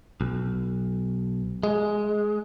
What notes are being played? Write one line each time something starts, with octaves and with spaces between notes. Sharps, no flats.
B1
G#3